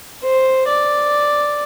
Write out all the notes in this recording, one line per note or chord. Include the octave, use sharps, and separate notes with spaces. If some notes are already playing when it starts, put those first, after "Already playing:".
C5
D5